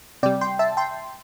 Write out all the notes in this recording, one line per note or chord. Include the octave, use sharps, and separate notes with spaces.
C3 G3 D5 G5
G5 C6
E5 A5
G5 C6